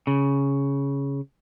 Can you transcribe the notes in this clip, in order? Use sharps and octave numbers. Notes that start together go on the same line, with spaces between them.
C#3